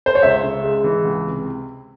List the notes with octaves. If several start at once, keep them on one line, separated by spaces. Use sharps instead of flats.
C5
C#5
C#2 E5
C#3
G#3
E3
C#2
C3